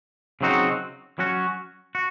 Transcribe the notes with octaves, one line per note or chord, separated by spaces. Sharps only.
C#3 F#3 C4 D#4 F#4
F#3 C#4 F#4
F#4